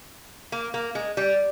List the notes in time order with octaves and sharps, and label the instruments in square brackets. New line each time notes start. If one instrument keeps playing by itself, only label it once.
[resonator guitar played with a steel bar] A#3
A#3
G#3
G3